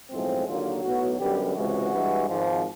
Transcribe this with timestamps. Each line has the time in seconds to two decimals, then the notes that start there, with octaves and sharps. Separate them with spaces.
0.11 B1 A2 F3 G#3 C4
0.47 D#2 D3 F#3 A#3 F4
0.82 B1 A2 F#3 B3 F#4
1.18 F#2 D3 G3 B3 G4
1.54 C#2 C3 E3 G#3 F#4
1.91 G2 E3 G#3
2.27 G#1 G#2 F3